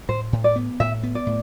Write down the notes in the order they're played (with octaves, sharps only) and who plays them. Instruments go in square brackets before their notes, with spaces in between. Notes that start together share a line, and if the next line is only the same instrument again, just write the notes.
[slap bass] A2 [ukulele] C5
[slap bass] A2
[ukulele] D5
[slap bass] B3
[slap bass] A2 [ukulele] E5
[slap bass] B3
[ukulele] D5
[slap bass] A2